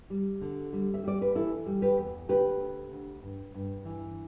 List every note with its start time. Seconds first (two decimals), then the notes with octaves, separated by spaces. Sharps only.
0.10 G3
0.41 D3
0.73 G3
0.94 E5
1.03 G3 D5
1.22 B4
1.35 E3 E4 A4
1.66 G3
1.82 G4 B4
1.98 E2
2.29 D2 G4 B4
2.60 D2
2.91 D2
3.23 G2
3.54 G2
3.85 E3